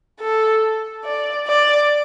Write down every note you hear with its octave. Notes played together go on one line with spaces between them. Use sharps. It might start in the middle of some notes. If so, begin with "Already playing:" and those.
A4
D5
D5